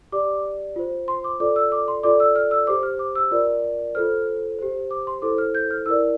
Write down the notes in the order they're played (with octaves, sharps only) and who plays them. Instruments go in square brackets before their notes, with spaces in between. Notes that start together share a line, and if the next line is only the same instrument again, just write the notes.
[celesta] G4 D5 D6
F4 C5
C6
D6
F4 A4 D5 D6
E6
D6
C6
F4 A4 D5 D6
E6
F6
E6
G4 C5 D6
F6
D6
E6
F4 A#4 D5
F4 A4 C5 F6
G4 C5
D6
C6
E4 A4 C5 D6
F6
G6
F6
E4 A#4 D5 E6